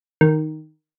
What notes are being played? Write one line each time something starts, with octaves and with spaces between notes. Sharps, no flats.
D#3